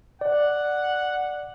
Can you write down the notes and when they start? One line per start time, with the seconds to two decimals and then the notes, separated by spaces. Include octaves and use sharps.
0.21 D5 F#5